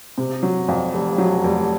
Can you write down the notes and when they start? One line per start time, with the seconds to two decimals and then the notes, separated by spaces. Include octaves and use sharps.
0.18 C3
0.43 F#3
0.68 F2
0.94 F1
1.18 F#3
1.44 F1